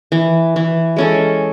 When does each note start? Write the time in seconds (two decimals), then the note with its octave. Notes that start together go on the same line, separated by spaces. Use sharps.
0.12 E3
0.56 E3
0.96 G#3 C#4 A4